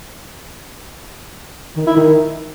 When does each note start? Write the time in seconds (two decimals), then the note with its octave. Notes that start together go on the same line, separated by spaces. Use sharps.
1.77 D#3
1.87 E4
1.97 D#3